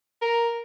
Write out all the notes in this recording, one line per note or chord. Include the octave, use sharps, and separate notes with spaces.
A#4